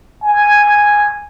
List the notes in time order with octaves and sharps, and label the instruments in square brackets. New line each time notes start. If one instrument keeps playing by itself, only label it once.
[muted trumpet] G#5